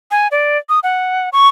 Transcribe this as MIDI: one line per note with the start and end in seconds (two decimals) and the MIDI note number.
0.11 0.28 80
0.31 0.58 74
0.69 0.80 87
0.83 1.29 78
1.33 1.48 85